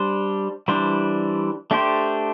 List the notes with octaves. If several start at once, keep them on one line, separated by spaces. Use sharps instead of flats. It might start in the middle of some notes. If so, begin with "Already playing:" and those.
Already playing: G3 D4 C5
E3 G3 D4 C5
A3 D4 G4 C5